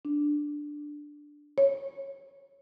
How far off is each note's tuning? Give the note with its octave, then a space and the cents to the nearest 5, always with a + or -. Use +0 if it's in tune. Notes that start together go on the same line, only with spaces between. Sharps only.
D4 +5
C#5 -15